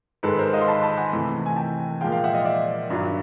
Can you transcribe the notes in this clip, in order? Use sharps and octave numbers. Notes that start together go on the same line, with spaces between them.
G#2 D#3 G#3 A4 B4
B4
A#4 C5
D#5 F5
C6
A5 B5
A5 B5
F#5 G#5
C3 E3 A3
G#5
G5 A5
A#2 F3 G#3 F5 G5
F5 G5
E5 F#5
D#5 F5
D5 E5
G2 D#3 F#3